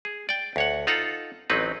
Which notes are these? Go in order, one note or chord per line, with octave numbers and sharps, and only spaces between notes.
G#4
D5 G5
D2 C#5 F#5
D#4 F4 A4 F#5 A#5
A1 F#3 C4 D#4 B4